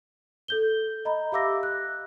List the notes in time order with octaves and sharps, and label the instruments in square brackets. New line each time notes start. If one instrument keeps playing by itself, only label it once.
[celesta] A4 G6 G7
D#5 A#5 B5
G4 E5 F5 D6 E6 A#6
F#6